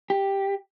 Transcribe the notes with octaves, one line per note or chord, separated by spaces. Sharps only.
G4